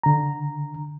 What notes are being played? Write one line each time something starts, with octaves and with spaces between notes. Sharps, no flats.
D3 A#5